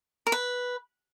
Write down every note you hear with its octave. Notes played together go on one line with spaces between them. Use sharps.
A#4
B4